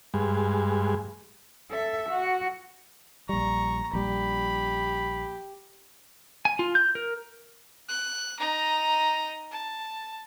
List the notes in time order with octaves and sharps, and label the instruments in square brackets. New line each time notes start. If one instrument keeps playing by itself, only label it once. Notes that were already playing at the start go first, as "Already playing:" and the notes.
[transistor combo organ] G2 G#3
[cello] A4 E5
F#4
[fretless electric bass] A#1 G3 [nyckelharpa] A#5 [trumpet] C#6
[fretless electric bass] A#1 G3 [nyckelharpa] G4 [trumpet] B5
[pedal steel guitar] G#5
F4
G6
A#4
[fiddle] F#6
D#4 A#5
A5